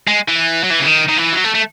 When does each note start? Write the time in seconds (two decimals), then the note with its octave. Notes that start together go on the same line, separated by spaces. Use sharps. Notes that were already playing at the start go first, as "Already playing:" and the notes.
0.07 G#3
0.28 E3
0.63 F#3
0.70 E3
0.80 C#3
0.86 D#3
1.09 D#3
1.18 E3
1.33 F#3
1.44 A3
1.55 A3